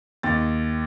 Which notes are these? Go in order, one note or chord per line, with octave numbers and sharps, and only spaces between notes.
D#2 A6